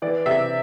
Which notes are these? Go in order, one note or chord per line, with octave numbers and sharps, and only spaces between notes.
E3 D5
C3 E5